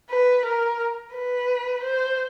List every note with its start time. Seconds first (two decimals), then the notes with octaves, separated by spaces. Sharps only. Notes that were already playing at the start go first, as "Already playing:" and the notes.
0.10 B4
0.45 A#4
1.13 B4
1.83 C5